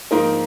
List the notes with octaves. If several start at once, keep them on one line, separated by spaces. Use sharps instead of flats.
G#2 F3 A#3 D#4 A#4